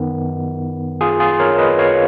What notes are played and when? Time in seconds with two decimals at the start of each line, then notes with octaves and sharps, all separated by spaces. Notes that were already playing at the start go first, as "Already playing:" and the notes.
Already playing: F#2 D#3 B3
1.01 F4 G#4
1.20 F4 G#4
1.40 A#4 C#5
1.58 B4 D#5
1.79 C#5 F5